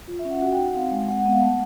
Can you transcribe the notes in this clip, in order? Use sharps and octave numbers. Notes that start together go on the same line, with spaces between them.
F4
E5
C#4
F#5
F#4
G5
D#4
F#5
C4 F5
G#3
G#3 F#5
B3
F5
A3 F#5